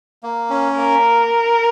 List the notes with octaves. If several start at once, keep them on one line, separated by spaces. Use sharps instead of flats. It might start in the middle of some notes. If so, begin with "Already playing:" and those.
A#3
C#4
A#3 A#4